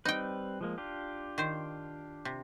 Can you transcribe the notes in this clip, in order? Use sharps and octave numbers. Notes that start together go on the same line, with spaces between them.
G3 C4 D#4 B4 G5
F3 G#3 A#3
D4 F4 G4
D#3 C5
C3